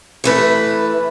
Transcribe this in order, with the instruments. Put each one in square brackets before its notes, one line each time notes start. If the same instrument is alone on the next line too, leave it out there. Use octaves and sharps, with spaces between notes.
[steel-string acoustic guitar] E3 A3 B4